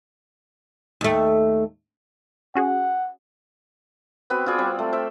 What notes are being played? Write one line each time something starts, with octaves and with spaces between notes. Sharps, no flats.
D#2 A3
C#4 F#4 G#4 F#5
B3 C4 F#4 B4
F4 F#4 G#4 D5
G3 C4
A3
C5 E5 G5